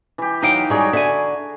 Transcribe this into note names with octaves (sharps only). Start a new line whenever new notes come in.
E3 G4
F#3 D#4 F5 G5
G3 G#3 C#4 F#4 G#4 A#5
D3 E5 G#5